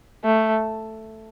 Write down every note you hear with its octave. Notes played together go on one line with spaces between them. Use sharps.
A3